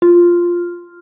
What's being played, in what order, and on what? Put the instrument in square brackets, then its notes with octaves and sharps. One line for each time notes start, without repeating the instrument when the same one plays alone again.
[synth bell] F4